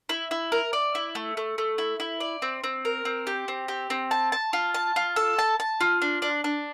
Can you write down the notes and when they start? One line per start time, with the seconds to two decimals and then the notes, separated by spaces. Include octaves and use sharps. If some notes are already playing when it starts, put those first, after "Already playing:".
0.09 E4
0.31 E4
0.52 A#4
0.73 D5
0.95 E4
1.15 A3
1.37 A3
1.58 A3
1.78 E4
2.00 E4
2.20 D5
2.42 C4
2.64 C4
2.85 A#4
3.05 C4
3.27 G4
3.48 C4
3.68 G4
3.90 C4
4.11 A5
4.32 A5
4.53 F4
4.74 A5
4.96 F4
5.16 A4
5.39 A5
5.60 A5
5.81 F4
6.02 D4
6.22 D4
6.44 D4